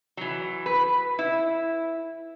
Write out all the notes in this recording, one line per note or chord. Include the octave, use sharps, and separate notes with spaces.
E3 F#3
B4
E4